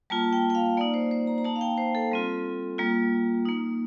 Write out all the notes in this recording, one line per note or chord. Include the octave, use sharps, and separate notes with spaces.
G3 A#3 F4 A5
G5
G5
F5
A#3 D#4 D5
C5
C5
A#5
A#5
A#3 D#4 A5
F5
G5
C5
A4
G3 C4 F4
G3 A#3 F4
A#3 D#4